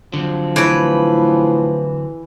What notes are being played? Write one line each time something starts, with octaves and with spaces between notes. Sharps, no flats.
D3 F3 F#3 C4
A2 E3 B4